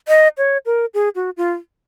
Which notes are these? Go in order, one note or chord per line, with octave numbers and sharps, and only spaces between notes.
D#5
C#5
A#4
G#4
F#4
F4